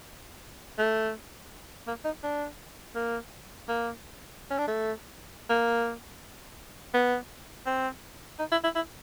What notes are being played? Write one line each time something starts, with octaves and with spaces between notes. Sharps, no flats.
A3
A#3
D#4
D4
A#3
A#3
C#4
D4
A3
A#3
B3
C4
D#4
E4
E4
E4